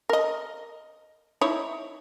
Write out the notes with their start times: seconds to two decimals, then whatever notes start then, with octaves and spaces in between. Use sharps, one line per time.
0.09 A#4 D#5
1.41 D#4 E4 C#5